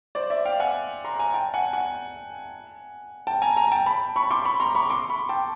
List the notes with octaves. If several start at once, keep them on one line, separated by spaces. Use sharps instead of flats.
C5 D5
D5 E5
F5 G5
F#5 G#5
A#5 C6
G#5 A#5
G5 A5
F#5 G#5
F#5 G#5
G5 A5
G#5 A#5
G#5 A#5
G5 A5
A5 B5
B5 C#6
C6 D6
B5 C#6
A#5 C6
B5 C#6
C6 D6
B5 C#6
G5 A5